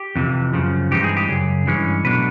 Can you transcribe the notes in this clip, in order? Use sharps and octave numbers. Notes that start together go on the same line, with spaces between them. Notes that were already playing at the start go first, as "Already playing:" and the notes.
Already playing: G4
F2 C3 E3
F#2 C#3 F3
G2 E3 G#3 C4 D#4 G4
G#4
G4
F#2 C#3 G#4
G2 E3 G#3 C#4
B2 F#3 A3 D4 B4